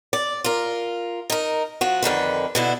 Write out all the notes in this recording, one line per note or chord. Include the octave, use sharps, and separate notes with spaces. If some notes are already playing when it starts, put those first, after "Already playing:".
D5
F4 A#4
D#4 A#4
F3 F#4
F2 D3 D#3 B4
B2 D3 E4